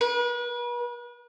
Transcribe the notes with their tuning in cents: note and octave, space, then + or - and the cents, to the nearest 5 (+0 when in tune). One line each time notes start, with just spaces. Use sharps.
B4 -40